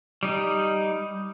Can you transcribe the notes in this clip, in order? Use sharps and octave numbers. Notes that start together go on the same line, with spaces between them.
G3 D#4